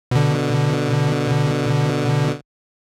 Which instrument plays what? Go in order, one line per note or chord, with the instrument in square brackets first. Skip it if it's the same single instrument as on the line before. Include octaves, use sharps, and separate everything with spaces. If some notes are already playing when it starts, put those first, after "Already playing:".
[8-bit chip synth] B2 D3